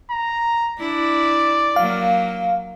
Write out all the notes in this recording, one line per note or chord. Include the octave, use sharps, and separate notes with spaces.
A#5
D4 E4 D5
F#3 A#3 F5